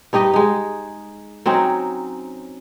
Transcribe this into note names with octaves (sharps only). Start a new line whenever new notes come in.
G2 D#4 G4 D#5
G#3 D#4
F#3 C4 C#4 D#4